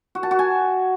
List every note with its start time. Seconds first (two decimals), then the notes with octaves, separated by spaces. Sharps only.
0.15 F#4
0.23 A5
0.31 F#4
0.39 G#5